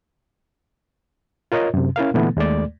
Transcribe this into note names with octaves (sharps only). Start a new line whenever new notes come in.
F4 A#4 C#5 D#5
F#2 C3
C#4 E4 A#4 F5
A#2 D3 E3 A3 B3
D#2 G#3 A3 D5